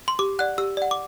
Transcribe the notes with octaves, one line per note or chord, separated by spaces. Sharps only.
C6
G4 D6
D5 F#5 F#6
G4 E6
D5 F#5
D6